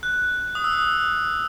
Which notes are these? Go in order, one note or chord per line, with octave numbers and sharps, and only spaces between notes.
F#6
D#6
E6